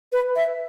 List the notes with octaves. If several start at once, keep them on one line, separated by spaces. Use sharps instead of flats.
B4
E5